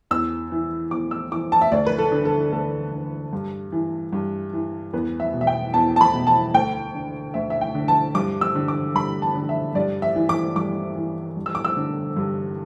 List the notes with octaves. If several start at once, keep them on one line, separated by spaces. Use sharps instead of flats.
E2 E6
E3
E2 D6
E6
E3 D6
A5
E5
D2 D5
B4
A4
D3
A4
D2 A4
D3
G2
E3
G2
E3
E2 B4
E5
B2
E5
G5
E2 A5
A5
B5
B2
A5
D2 G5
D3
D2 E5
E5
G5
D3
A5
G2 D6
E6
D3
D6
G2 B5
A5
D3
E5
G2 D5
E5
E3
D6
G2 D6
E3
G2
E6
D6
E6
D3
G2